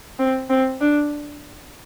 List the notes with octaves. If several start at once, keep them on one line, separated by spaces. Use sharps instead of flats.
C4
C4
D4